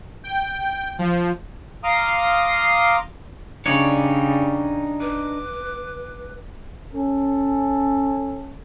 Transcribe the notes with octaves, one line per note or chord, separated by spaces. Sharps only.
G5
F3
F5 A#5 C6 D6 D#6
C#3 G3 D4 D#4 C#5 D5
B4 D6
C#4 A4